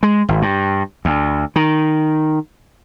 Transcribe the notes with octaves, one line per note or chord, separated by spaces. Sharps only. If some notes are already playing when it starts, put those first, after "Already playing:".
G#3
G#1
G2
D2
D#3